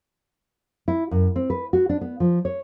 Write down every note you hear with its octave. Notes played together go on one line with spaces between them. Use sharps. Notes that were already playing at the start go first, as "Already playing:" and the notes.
E4
F#2
C4
B4
F#4
D4
B3
F3
C#5